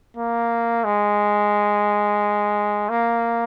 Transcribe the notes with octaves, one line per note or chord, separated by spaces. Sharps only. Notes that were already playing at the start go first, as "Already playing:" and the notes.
A#3
G#3
A#3